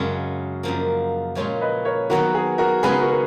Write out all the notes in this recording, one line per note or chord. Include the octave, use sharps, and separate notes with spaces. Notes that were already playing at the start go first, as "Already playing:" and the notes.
Already playing: F#2 C#3 G#3 F5
F#2 F3 A#3
A#2 F3 G#3 C#4 F4 A#4 C#5
B4 D#5
A#4 C#5
D#3 F#3 B3 D#4 F#4 A#4
G#4
F#4 A#4
C#3 G#3 B3 D#4 G#4 B4
F#4 A#4
A#4